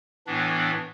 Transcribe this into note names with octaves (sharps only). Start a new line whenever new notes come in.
A2 E3 B3 D4